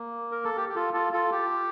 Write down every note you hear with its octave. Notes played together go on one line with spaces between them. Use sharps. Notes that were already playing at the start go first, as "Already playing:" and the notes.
Already playing: A#3
A#4
A4
G4
G4
F4 A4
F4 A4
F4 A4
G4